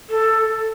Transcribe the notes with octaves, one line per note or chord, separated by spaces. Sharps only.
A4